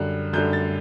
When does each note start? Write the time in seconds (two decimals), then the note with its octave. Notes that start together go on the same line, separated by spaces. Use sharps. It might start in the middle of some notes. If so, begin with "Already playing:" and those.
Already playing: F#2 D3 G3 F#6
0.33 F#2 D3 G3 G6
0.53 A6